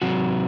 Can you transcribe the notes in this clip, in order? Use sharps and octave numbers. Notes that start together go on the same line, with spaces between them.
C3 F#3 C4 F#4